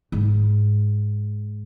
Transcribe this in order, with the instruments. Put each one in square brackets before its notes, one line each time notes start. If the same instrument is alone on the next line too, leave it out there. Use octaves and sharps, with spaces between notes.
[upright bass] G#2